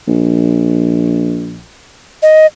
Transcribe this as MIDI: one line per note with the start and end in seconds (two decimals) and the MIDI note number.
0.08 1.68 34
2.22 2.46 75